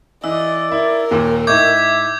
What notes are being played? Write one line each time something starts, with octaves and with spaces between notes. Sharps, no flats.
E3 D5 D#5 E6
E4 A#4
D#2 A#2
A2 D#4 E5 C#6 D6 G6 G#6